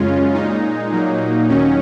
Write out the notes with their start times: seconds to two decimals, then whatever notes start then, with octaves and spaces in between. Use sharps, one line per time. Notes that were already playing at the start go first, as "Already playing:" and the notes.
Already playing: F#2 C#3 G#3 C#4 F4
0.34 A#2 G#3 D#4
0.92 A#2 F#3 A#3
1.49 D#2 D#3 F#3 C#4